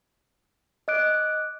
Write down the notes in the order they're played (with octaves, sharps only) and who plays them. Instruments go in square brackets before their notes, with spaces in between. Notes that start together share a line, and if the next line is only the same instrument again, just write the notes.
[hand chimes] D#5 D6 F#6 D7